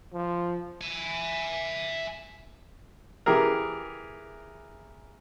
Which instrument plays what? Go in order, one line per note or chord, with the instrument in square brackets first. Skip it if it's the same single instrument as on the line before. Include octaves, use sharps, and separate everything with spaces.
[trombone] F3
[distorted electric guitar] E5 G#5
[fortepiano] E3 G4 G#4 A#4